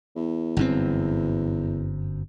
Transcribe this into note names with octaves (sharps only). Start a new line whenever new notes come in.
E2
G1 F#2 C4